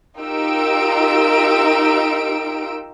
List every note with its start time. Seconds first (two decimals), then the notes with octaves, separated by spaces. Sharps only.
0.17 D#4 F4 G4 A#4 E6 D7